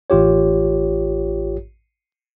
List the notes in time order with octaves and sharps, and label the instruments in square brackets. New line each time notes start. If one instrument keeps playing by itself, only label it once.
[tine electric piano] A1 F4 G4 C#5